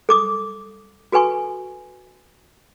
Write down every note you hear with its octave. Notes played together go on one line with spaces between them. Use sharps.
A4 D6 D#6
F#4 A4 B4 G#5 C#6